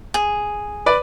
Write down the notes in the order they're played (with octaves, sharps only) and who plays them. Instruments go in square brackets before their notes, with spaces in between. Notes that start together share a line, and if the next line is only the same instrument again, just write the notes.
[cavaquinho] G#4
[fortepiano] B4 D5